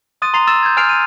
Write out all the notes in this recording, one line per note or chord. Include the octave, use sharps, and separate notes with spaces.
C6 D#6 F#6 A6 D#7
A#5 C6 A6 C7 F7
E6 A6 E7
G6 G#6
G#5 F6 G6 C7 D7 F7
D#7